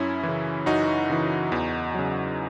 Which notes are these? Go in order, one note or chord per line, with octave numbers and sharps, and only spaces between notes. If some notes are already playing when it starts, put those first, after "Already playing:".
Already playing: F#2 C#4 E4
C#3 E3
F#2 D#4 F#4
C#3 E3
E2
C#3 F#3